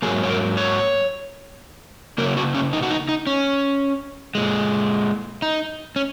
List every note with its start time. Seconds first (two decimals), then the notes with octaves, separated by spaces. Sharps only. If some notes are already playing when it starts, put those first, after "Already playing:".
0.02 G#2 F#3 A#3 G#4
0.23 C#5
0.29 A#4
0.57 C#5
2.18 C#3 F#3 A#3 A#4
2.37 F#4
2.55 C#4
2.73 D#4
2.82 F#4
2.91 D#4
3.09 D#4
3.27 C#4
4.35 A#2 G#3
5.42 D#4
5.96 C#4